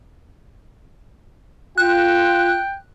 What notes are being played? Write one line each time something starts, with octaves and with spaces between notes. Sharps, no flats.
F4 G5 F#6